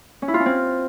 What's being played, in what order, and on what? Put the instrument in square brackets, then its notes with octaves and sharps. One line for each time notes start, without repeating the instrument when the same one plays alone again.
[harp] C#4
E4
F4
C#4
C4